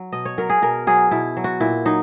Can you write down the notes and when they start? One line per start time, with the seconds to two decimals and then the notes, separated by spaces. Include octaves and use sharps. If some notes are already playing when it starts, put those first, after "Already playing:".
Already playing: F#3
0.12 B2 D#5
0.25 C#5
0.38 F#3 A#4
0.50 G#4
0.62 B2 A#4
0.87 F#3 G#4
1.11 B2 E4
1.37 F#3
1.44 F#4
1.61 A#2 E4
1.85 F#3 D#4